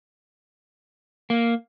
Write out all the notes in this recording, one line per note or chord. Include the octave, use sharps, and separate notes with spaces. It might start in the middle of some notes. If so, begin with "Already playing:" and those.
A#3